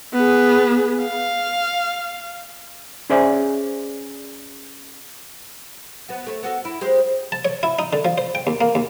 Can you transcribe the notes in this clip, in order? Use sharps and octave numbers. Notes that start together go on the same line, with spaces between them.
B3 G#4
F5
C#4 G#4 C5 D5 E5 G#5
B3 F#4
A3 C#5
B3 F#4 A4
E4
G#3 G4 C5
A5
C#5
E4
D#4
D3
F3
C5
G5
D#2
A#3
D#2